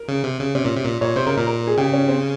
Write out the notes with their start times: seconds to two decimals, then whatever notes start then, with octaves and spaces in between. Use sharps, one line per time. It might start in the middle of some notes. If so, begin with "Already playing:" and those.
Already playing: A#4
0.08 C#3
0.24 C3
0.40 C#3
0.55 C3 C#4
0.65 A#2
0.76 C3
0.85 A#2
1.01 A#2 C#5
1.16 C3 C5
1.26 C#3 A#4
1.36 A#2 A#4
1.47 A#4
1.67 G#4
1.78 C#3 G4
1.93 C#4
2.08 C4